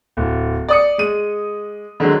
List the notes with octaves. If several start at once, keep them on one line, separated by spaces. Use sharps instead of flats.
D1
D5 D#6 C#7
G#3 D#7
D3 D#3 F#3 G#3